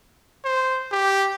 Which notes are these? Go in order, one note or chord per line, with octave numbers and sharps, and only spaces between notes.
C5
G4